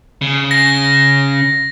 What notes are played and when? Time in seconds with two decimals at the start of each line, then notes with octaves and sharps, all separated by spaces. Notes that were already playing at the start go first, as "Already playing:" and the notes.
0.21 C#3
0.51 A#6